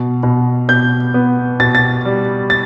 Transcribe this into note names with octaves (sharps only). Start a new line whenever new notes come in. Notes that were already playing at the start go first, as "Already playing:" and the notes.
Already playing: B2
B2
B2 G6
B3
B2 A6
A6
G3
A6